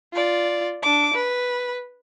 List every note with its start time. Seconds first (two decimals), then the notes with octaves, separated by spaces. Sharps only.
0.14 F4 D5
0.83 D4 D6
1.14 B4